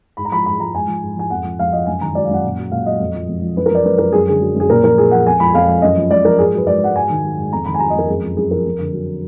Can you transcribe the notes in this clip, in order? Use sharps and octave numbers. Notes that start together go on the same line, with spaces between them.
G#2 B5
A#5
F3 B5
G#2 B5
F3 A#5
G#2 G#5
F3
G#2
F3 G#5
F2 F#5
F3
F2 F5
F3 D#5
F#2 G#5
D#3 A#5
F#3 D5
F5
F#2 F#5
A#2
F#3
A#2 F5
F#3 D#5
F2
F3
F2
F3
F#2 B4
A#4
F3 D5
F#2 B4
F3 A#4
F#2 G#4
D3 G#4
F#3
F#2
G#4
A#2 A#4
F3 A#4
A#2 G#4
F3 F#5
F2 G#5
F3 B5
F2 F5
F3
F#2 D#5
F3
F#2 D5
F3 A#4
G#2 G#4
F#3 B4
G#2 D5
F#3 F#5
G#2 G#5
D#3
F#3
G#2
F2 A#5
D#3 B5
G#5
F#3 A#5
D#5
F2 A#4
F#2 G#4
F3
F#2 G#4
F3 A#4
F2
D3
F#3